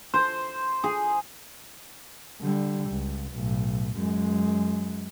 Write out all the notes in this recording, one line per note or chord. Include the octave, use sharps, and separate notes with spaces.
C5
G#4
D3 G3
C#2
B1 A2
F#2 G#3